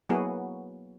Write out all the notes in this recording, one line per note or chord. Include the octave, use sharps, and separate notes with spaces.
F#3 A#3 B3 E4 F#4 G#4